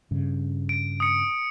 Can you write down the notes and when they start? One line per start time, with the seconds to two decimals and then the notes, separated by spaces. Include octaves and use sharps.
0.11 G2 C#3
0.69 D7
1.00 D#6 C#7